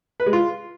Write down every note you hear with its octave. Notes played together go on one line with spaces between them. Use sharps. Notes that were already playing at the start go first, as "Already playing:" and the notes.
B4
G#3
F4